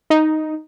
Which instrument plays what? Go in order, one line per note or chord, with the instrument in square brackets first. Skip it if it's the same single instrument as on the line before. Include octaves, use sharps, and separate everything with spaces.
[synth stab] D#4